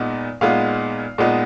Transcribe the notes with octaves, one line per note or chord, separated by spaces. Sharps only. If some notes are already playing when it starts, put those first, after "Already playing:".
Already playing: A#2 G#3 B3 D#4
A#2 G#3 B3 D#4 F5
A#2 G#3 B3 D#4